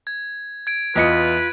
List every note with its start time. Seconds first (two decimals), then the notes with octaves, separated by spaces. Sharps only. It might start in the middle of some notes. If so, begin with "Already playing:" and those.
0.07 G#6
0.67 G#6 D7
0.96 E2 F4 B4 D#5 C#7